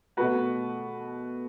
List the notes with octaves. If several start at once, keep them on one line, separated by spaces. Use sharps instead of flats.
B2 A3 F#4 B4